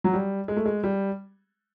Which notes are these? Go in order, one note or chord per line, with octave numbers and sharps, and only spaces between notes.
F#3
G3
G#3
A3
G#3
G3